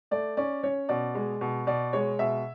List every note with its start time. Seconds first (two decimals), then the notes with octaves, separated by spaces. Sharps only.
0.11 A3 D5
0.37 C#4 D5
0.63 C#4 C#5
0.89 B2 D5
1.15 G#3
1.41 B2
1.67 B2 D5
1.93 G#3 C#5
2.19 B2 E5